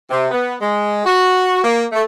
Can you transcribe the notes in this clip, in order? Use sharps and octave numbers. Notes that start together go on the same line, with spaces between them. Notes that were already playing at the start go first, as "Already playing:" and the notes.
C3
B3
G#3
F#4
A#3
A3